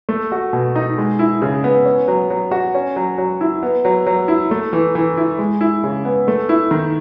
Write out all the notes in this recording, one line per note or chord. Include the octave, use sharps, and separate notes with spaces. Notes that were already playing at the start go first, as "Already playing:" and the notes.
A3
F#4
B2
D#4
G#3
E4
C#3
B3
C#4
F#3
F#3
F#4
C#4
F#3
F#3
E4
B3
F#3
F#3
E4
A3
E3
E3
E4
G#3
E4
C#3
B3
A3
E4
D#3